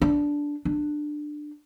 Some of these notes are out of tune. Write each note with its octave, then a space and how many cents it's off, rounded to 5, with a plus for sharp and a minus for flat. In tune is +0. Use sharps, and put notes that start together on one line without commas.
D4 -10
D4 +15